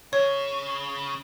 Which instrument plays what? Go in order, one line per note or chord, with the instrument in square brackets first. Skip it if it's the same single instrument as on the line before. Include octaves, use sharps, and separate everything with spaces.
[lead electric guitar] C#3 [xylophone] C#5